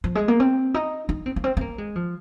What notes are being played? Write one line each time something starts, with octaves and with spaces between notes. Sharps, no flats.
F3
G#3
A#3
C4
D#4
D#4
C4
A#3
C4
C4
A#3
G#3
F3